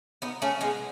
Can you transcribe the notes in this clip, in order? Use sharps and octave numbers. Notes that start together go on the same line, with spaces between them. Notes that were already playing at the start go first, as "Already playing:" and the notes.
B3 D#4
A3 C#4
G#3 B3